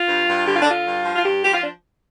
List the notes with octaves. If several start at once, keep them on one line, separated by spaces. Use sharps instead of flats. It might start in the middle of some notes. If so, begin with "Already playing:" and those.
Already playing: F4
G2
G2
D3 G4
F4
D4
D3 F4
G2
F3
F4
G2 G4
F3 G4
F4
D4